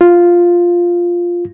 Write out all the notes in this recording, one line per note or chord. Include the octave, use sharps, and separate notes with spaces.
F4